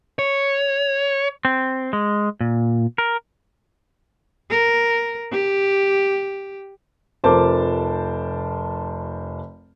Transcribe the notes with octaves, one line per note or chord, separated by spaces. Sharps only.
C#5
C4
G#3
A#2
A#4
A#4
G4
F1 F3 A#4 C5 A5 D6